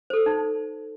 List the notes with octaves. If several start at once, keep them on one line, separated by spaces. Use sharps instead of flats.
A4 C5
D#4